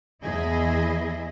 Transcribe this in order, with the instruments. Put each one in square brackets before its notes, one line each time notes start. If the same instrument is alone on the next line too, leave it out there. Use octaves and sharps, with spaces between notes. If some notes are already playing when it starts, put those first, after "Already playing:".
[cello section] E2 E4 G#4 D#5